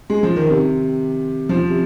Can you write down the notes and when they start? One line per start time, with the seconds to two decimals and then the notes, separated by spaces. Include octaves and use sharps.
0.10 G#3
0.23 F3
0.36 D#3
0.50 C3
1.49 F3
1.70 C3